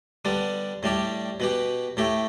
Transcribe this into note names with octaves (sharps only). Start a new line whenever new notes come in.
D3 G3 B3 D4
A2 G3 D4 G4
B2 B3 G4
A2 A3 G4